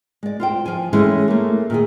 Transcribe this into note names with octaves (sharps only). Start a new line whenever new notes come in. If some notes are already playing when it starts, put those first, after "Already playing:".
G#3 D5
F4 C5 G5
F3 G#5
E3 G#3 A3 C#4 E4
A3 A#3
A#2 D#3 G4 G#4